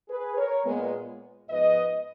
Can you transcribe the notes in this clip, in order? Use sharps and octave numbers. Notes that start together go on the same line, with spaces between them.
G#4 B4
A#4 C#5
A#2 G#3 B3
G#2 F3 B3 B4 D#5